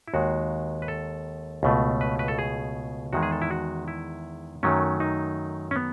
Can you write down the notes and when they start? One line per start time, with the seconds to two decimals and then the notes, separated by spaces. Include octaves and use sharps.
0.08 E4
0.14 D#2 D#3 G#3 F#4
0.82 B4
0.88 A4
1.63 C#2 B2 A3
2.01 B4
2.19 B4
2.28 A4
2.39 G#4
3.13 E2 D#3 G#3 F#4
3.23 G#4
3.32 A4
3.42 E4
3.51 F#4
3.88 E4
4.63 F#2 D#3 F#3 A3 C#4
5.00 D#4
5.71 C#4
5.76 B3